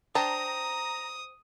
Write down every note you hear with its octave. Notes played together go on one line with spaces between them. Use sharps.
D4 C5 G5 A#5 D#6